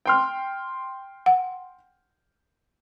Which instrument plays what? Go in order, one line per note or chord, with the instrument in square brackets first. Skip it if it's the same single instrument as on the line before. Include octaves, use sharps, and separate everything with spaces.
[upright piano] G5 C6 F6
[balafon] F#5